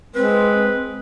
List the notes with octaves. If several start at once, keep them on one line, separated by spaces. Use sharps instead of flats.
G#3 C4 B4